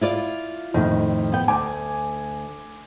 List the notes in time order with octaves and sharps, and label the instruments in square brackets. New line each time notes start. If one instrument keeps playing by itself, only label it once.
[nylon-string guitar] E4 F4 D5
[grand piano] F2 A2 [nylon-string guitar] D#3
[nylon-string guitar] B3 G5
[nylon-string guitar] D2 [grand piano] G#5 D6